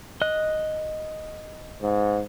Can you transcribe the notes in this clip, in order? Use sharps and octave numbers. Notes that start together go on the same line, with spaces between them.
D#5 F#6
G#2